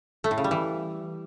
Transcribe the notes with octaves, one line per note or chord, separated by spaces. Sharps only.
A3
A2
C#3
G3
E3